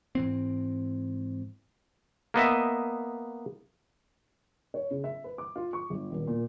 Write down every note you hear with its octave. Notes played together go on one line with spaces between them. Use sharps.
G#2 E3 C4
A#3 B3 D#5 E5
C#5
C#3
E5
B4
D6
F4
C#6
G1
D#1
A#2